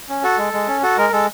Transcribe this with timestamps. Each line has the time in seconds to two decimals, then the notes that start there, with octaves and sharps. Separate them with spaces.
0.09 C#4
0.24 F#4 A4
0.39 G#3
0.53 G#3
0.68 C#4
0.83 F#4 A4
0.98 G#3 A#4
1.13 G#3 A4